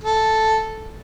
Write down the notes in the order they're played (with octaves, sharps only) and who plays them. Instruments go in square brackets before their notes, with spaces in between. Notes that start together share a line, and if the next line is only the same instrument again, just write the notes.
[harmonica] A4